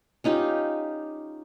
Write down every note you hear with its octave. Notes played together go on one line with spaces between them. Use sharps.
C#4 D#4 F4 G4